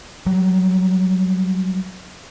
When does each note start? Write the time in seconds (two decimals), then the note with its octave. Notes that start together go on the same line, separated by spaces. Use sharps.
0.26 F#3 G3